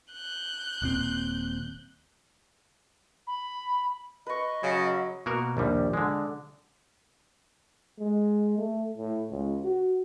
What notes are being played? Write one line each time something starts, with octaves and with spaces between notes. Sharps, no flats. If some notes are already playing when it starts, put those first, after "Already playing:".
F#6 G6
D#1 A#2 C4
B5
B4 D#5 C#6
C#3 F#3
B2 A#3 F#4 A#4
A#1 D#2 G3
D3 G#3
G#3
A3
A2
C#2
F#4